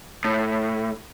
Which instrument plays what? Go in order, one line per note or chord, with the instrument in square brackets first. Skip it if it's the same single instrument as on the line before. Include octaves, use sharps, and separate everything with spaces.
[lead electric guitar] A2